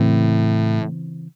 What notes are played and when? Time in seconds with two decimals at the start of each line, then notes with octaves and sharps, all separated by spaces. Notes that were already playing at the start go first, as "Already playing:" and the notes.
Already playing: A2 C#3 E3 C4